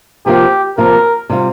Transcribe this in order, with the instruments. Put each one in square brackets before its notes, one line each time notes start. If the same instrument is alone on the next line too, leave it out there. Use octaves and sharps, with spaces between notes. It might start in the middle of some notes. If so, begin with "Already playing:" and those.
[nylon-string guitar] C3 F3 A#3 F4 [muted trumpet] G4
[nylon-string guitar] C3 F3 A#3 F4 [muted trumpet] A#4
[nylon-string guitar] C3 G3 C4 F4